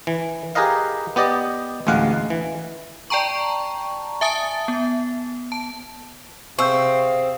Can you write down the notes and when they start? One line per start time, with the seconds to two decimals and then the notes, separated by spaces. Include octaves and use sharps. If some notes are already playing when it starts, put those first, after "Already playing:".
0.07 E3
0.55 G4 G#4 A#4 B4 D#5 F5
1.16 B3 G4 D5 D#5
1.87 A1 D2 G#3 F5 F#5
2.30 E3
3.10 D5 G5 A5 A#5 C#6
4.21 E5 G#5 A5 D#6 A6
4.68 B3
5.52 A5
6.59 C3 C4 G#4 E5 F5 C#6 E6 G6